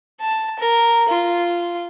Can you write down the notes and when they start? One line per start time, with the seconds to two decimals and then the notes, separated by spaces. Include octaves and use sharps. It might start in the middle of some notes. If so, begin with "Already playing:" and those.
0.20 A5
0.59 A#4
1.09 F4